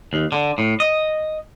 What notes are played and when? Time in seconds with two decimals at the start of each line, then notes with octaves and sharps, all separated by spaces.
0.13 D#2
0.32 D3
0.58 A2
0.80 D#5